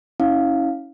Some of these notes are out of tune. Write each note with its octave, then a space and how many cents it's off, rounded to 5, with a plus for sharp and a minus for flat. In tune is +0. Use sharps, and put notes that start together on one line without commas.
C#4 +0 E4 -30 F5 +0